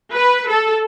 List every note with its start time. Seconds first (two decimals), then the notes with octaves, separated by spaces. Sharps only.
0.13 B4
0.48 A4